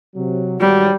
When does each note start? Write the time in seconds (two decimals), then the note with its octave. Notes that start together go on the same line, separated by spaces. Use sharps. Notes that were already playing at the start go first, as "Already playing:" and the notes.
0.16 C3 F#3
0.60 G#2 D#3 F#3 G3